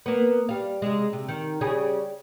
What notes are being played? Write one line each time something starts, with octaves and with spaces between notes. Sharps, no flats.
A#3 B3
G3 F5
C3 G#3
C3
D#3
C#3 G3 G#4